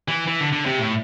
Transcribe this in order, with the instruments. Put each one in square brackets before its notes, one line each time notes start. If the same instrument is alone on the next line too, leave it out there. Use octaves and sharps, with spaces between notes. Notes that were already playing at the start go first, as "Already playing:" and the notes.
[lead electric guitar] E3
E3
D3
D3
C3
A2